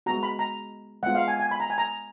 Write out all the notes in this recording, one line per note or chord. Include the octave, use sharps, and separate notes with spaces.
G#3 B3 F#4 A#5
B5
A#5
G#3 B3 F4 F#5
F5
G#5
G#5
B5
A#5
G#5
A#5